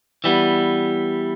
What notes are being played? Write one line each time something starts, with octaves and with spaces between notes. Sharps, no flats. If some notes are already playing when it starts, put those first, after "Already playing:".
E3 G3 B3